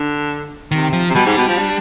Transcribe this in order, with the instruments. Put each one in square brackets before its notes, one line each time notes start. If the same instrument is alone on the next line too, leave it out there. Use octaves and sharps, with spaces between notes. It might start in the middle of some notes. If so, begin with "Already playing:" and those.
Already playing: [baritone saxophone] D3
[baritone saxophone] C3 [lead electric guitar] D#3
[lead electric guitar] F3
[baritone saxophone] C3
[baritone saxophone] B2 [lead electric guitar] G3
[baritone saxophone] G#2
B2
F3
D4